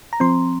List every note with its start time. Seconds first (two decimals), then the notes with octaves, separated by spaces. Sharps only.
0.13 A#5
0.20 F3 C4 C6